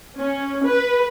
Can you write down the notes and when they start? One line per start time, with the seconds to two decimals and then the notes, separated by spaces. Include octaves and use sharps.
0.16 C#4
0.65 B4